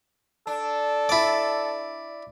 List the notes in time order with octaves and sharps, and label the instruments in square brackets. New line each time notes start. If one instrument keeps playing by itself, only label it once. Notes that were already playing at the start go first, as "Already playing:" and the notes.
[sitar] D4 [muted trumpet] A4
[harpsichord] E4 D5